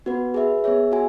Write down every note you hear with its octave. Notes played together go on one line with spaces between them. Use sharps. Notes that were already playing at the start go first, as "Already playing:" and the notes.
B3 F#4 B4
G#4 B4 E5
B3 G#4 C#5 E5
F#4 E5 G#5